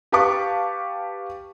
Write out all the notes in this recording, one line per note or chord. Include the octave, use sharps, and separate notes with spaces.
G4 B4 F5 A5 C#6 D6